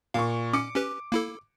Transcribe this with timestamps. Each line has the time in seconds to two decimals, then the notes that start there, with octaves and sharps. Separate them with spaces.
0.14 A#2 F5 C#6
0.53 C#4 D6 C#7
0.75 C#4 G4 B4
1.12 A#3 E4 A4